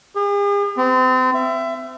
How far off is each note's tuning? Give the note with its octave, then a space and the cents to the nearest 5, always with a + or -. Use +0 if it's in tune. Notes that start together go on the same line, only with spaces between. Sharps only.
G#4 -45
C4 -35
E5 +20